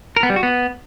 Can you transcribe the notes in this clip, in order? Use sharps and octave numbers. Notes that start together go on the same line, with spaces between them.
A#4
B3
G3
F#4
B3